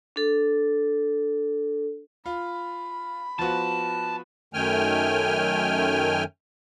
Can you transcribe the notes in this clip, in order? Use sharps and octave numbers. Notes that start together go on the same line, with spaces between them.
D4 A4
F4 B5
F3 B3 F#4 A5
F#2 D#3 A3 G5 G#5 F6